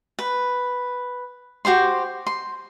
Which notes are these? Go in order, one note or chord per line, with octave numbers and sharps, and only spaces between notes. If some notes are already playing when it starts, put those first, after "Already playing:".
B4
F#4 G4 C5 C6
C6